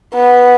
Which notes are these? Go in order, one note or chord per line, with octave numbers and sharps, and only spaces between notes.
B3